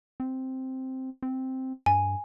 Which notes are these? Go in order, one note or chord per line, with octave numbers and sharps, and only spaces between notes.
C4
C4
G2 G#5